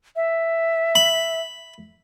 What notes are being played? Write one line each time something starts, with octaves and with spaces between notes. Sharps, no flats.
E5
B5